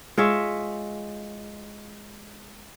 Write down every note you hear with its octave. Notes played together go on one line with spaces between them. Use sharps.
G#3 F4 C#5 E5